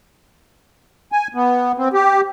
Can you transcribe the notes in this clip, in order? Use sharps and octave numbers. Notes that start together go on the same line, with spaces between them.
G#5
B3
C4
G4